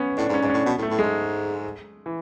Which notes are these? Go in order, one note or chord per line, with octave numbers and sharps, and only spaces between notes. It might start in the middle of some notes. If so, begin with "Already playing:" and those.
Already playing: B3 C#4
A2 D4
G#2
C#4
G#2 D4
C#4
A2
B2 B3
A2
A3
A2
G#2 G#3
E3